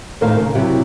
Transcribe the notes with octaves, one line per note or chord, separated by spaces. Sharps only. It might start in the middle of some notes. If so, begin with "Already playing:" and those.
D#2 A2 D#3 A#4 C5 F5
C#3
C3 F#3 E4 G4